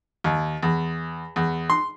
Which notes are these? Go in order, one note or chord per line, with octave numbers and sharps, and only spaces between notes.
D#2
E2
E2
C6